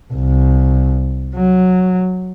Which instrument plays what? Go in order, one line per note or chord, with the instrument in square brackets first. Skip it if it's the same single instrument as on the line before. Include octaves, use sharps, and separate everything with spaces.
[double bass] C2
F#3